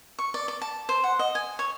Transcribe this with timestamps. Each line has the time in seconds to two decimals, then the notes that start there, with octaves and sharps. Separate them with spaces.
0.19 C#6
0.34 D5
0.48 D5
0.61 A5
0.89 C5
1.04 F#5
1.19 D#5
1.35 G#5
1.59 C#5